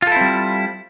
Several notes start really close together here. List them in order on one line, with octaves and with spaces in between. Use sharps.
F4 A4 E4 C4 G3